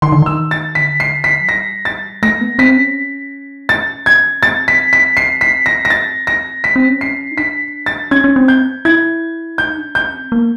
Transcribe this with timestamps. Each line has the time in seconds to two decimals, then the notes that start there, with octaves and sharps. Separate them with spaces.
0.02 D#3 C6
0.12 D3
0.22 D#3 E6
0.51 A6
0.75 D3 B6
1.00 C7
1.24 B6
1.41 F#3
1.48 G3 A#6
1.85 A6
2.23 A3 A#6
2.41 B3
2.59 C4 B6
2.77 C#4
3.69 A6
4.06 G#6
4.43 C4 A6
4.68 B6
4.93 B6
5.17 C7
5.41 B6
5.66 A#6
5.85 A#6
5.90 A6
6.27 A#6
6.64 C#4 B6
6.76 C4
6.88 C#4
7.01 C7
7.32 D#4
7.37 D4 B6
7.86 A6
8.11 C#4 G#6
8.24 C#4
8.36 C4
8.48 G6
8.85 E4 G#6
9.58 D#4 G6
9.76 D4
9.95 C#4 G6
10.13 C4
10.32 A#3